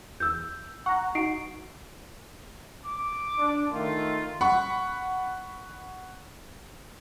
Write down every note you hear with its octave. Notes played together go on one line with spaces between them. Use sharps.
E2 E6 G6
F#5 A#5 C#6
D#4 F#4 C7 D7
D6
D4
D#3 A3 F4
F#5 B5 C#6